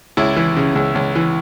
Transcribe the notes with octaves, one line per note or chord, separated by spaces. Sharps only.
C#2 E4
E3
C#3
C#2
C#2
E3